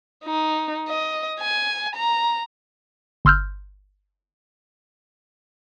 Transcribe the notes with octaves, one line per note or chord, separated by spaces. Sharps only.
D#4
D#5
G#5
A#5
G1 C6 E6 F6 G6